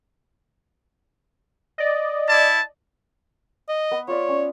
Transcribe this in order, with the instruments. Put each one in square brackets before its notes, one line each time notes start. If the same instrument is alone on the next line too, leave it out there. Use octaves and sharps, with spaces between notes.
[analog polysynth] D5 D#5
[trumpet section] E4 A5
[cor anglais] D#5
[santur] B3
[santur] F4 D5 E5 [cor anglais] C#5
[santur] C#4